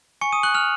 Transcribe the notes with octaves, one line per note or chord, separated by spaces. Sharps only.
G#5 C#6 C#7
D#6 D#7
C#6 F#6 F#7
F6 F7